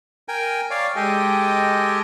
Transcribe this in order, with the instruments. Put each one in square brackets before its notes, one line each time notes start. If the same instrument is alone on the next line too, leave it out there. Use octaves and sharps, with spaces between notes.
[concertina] A#4 G5 G#5
C#5 D5 F5
[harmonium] G#3 G5 G#5 [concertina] G4 A4 D#5